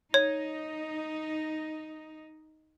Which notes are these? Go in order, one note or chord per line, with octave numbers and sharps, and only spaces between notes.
D#4 C#5